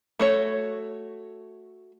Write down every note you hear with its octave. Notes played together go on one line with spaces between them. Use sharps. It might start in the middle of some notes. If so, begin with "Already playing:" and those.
A3 F#4 C#5